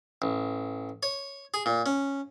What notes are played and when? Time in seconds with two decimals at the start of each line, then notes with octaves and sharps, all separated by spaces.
0.22 A1
1.03 C#5
1.54 G#4
1.66 A#2
1.86 C#4